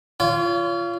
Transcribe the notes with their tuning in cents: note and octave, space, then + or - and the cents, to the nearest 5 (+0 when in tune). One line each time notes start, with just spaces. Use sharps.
F4 -20 C#5 +35